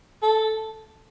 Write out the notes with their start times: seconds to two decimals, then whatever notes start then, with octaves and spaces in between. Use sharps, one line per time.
0.22 A4